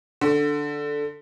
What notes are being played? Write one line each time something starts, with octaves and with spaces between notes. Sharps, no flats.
D3